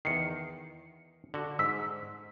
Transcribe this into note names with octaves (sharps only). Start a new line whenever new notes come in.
E2 D#3 C7 C#7
D3 F#4
G#2 E6 B6